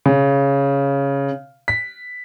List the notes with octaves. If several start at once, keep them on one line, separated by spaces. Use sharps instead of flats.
C#3
B6